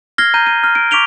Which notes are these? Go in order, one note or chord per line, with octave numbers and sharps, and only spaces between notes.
F6 G#6 A#6 C7 G7
A#5 G6 D#7
D#7
F6
D7
C#6 D6 B6 D7 F7 G7